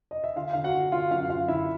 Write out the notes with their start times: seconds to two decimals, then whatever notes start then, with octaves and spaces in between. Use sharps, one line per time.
0.11 D#5
0.24 E5
0.36 D3 F4 F5
0.53 D3 F5
0.64 F#4 F#5
0.74 D3
0.92 D3 F4 F5
1.11 F#2 F4 F5
1.29 F#2 F4 F5
1.48 D3 E4 E5